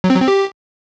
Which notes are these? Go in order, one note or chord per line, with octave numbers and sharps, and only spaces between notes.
F#3
C4
F#3
C4
G4